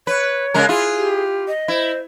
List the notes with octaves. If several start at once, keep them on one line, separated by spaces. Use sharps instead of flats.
B4 C#5
C#3 G#3 A#4
E4 F4 G#4
G4
D#5
E4 C5